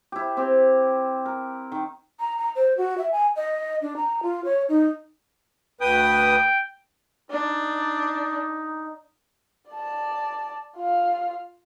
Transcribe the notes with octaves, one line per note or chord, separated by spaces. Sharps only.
E4 G4
C4 G4
A#4
D#3
A#5
A#5
C5
F#4
E5
G#5
D#5
D4
A#5
F4
C#5
D#4
D2 B4 G5 D#6
D4 D#4
D5 A5
F4 F5